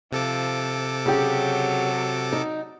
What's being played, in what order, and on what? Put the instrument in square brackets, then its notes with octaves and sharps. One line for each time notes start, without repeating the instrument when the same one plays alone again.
[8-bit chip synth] C3 A4 D6 [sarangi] F3
[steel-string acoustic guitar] C#3 G4 [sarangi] F#3
[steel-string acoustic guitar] D#4